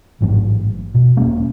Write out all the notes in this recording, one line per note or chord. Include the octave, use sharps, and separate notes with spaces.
A1 G#2 F#3 A3
B2
E1 G#3 A#3 C#4